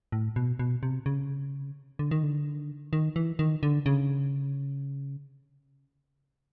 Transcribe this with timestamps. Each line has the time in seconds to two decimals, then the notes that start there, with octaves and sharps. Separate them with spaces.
0.12 A2
0.36 B2
0.59 B2
0.83 C3
1.06 C#3
1.99 D3
2.11 D#3
2.23 D3
2.93 D#3
3.16 E3
3.39 D#3
3.63 D3
3.86 C#3